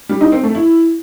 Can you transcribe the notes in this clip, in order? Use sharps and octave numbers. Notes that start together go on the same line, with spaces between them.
G3
D#4
C4
A3
E4